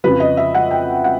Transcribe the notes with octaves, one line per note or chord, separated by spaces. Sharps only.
F2 C#3 F3 B4
D#5
E5
F#5
G5
F#5